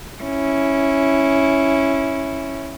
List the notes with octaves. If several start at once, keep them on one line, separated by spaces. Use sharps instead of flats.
C#4 E4